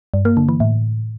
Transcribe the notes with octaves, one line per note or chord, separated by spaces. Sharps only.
G2
A#3
D3
E3
A2